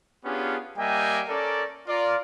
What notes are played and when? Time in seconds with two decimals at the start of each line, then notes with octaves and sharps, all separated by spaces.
0.24 B3 C#4 D4 F4 G4 G#4
0.78 G3 A#3 D#5 E5 G5 G#5
1.29 C#4 A4 A#4 D5
1.87 F4 A#4 D5